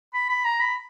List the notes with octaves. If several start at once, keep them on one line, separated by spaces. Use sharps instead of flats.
B5
B5
A#5
B5